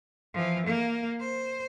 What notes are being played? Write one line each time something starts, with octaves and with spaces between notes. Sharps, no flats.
E3 F3
A#3
C5